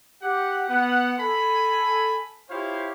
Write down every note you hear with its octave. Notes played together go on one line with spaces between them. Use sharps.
G4 F#5
B3 F#5
A4 G#5 B5
E4 F4 G4 C5 C#5 F5